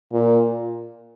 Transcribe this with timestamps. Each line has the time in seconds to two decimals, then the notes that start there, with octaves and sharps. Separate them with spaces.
0.12 A#2